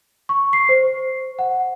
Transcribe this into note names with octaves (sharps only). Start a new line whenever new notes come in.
C#6
C7
C5
F#5